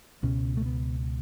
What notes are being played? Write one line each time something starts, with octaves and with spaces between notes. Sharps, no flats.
C#2 B2 C#4
A3
B3